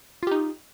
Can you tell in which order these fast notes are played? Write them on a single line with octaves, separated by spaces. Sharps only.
F4 G4 D#4